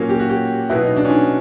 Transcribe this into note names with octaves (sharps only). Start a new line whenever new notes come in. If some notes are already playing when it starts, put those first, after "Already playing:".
Already playing: A#2 F#3 A#3 C#4
G4
F#4
G4
B2 F#3 B3 E4
D#4
D4
C#4
D4